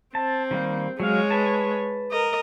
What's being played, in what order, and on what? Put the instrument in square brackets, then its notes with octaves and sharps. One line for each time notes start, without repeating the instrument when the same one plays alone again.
[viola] C4 [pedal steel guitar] A5
[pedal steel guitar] D#3 G3 A#3
[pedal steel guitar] F#3 F5 [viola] G#3 C#5
[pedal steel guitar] B4 A5
[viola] A#4 D#5